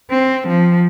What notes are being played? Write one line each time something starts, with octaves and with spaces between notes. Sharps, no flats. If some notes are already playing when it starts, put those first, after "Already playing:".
C4
F3